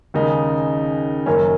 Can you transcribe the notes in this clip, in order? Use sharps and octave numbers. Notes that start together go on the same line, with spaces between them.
D#2 C#3 G#3 D#4
F#1 F#2 D#3 A#3 C#4